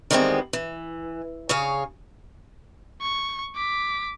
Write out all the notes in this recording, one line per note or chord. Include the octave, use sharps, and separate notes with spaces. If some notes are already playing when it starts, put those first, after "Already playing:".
D#3 E3 G3 G#3 B3 C4
E3
C#3 G#4 C#5 F5
C#6
D6 B6